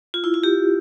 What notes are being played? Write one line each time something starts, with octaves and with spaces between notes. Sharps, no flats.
F4
E4
F4
G4